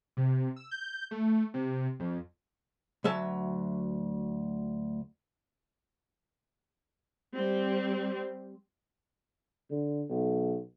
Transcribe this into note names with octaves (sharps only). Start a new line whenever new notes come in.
C3
E6
G6
A3
C3
F2
D2 F#3 E5 A5
G3 C4
D3
B1